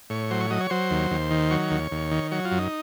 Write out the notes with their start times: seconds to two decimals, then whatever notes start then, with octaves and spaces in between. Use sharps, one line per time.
0.10 A2 C#5
0.31 F#3 C5
0.40 C#5
0.50 F#3 D#5
0.60 C#5
0.70 F#3 C5
0.91 D#2
1.11 D#2
1.31 D#3
1.51 F#3 C#5
1.71 D#2
1.91 D#2
2.11 D#3
2.31 F#3 C#5
2.45 F4
2.51 F#2
2.58 D#4